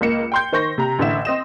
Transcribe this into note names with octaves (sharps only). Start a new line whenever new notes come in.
C#2 A#3 C#7 E7
G5 C6 G6
D#3 C5 C#6 G6 A#6
C3 A#5
A1 D3 E4 E5 E7
C4 D#5 E7